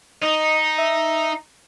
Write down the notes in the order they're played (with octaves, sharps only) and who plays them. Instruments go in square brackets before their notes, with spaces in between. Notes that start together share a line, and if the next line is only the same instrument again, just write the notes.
[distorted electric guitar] D#4 [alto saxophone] D#5
[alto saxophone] E5